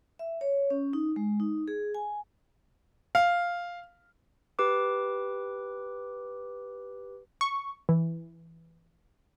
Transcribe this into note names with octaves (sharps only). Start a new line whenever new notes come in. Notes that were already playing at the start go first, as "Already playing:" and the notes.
E5
C#5
C#4
D#4
G#3
D#4
G#4
G#5
F5
G4 B4 D6
C#6
E3